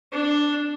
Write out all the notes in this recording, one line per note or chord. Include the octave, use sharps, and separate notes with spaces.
D4